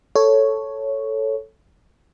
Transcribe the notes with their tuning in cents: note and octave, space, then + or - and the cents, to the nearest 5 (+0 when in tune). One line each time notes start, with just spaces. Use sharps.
A4 +0 C#5 +0